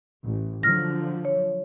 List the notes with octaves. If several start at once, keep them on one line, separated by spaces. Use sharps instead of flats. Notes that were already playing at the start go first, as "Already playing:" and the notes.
A1
D3 F3 F#3 F6 A#6
C#5